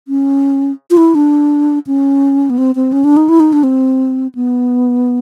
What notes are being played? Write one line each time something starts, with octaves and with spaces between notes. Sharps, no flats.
C#4
F4
E4
D4
C#4
B3
C4
C4
C#4
D4
D#4
E4
D#4
D4
C4
B3